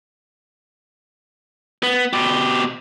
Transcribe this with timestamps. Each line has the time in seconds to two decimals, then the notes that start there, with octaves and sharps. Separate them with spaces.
1.83 B3
2.13 B2 G4